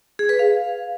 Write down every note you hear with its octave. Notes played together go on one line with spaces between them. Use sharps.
G#4
B4
F5